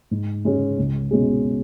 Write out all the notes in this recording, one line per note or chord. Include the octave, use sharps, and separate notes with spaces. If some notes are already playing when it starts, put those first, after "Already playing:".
G#2
G#3 C#4 G#4
C#2
B2 G#3 C#4 G#4